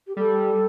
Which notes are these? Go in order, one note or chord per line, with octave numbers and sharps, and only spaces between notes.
G4
G3 A4